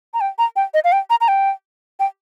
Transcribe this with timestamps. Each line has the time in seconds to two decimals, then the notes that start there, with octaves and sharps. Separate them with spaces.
0.14 A#5
0.21 G5
0.39 A#5
0.56 G5
0.74 D#5
0.84 F5
0.92 G5
1.10 A#5
1.21 A#5
1.28 G5
2.00 G5